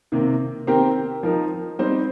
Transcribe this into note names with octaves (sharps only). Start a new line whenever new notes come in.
C3 D#3 A#3
D#3 C4 G4 A#4
F3 D#4 A#4
G3 C4 D#4 C5